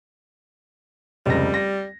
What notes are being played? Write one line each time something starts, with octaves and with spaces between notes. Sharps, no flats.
F1 C#2 G3 A#6
A#6